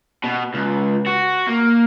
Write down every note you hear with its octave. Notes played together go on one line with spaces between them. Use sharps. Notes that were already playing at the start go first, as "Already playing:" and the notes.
B2
C#2
F#4
A#3